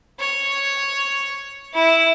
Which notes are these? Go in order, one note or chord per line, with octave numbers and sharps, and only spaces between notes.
C#5
E4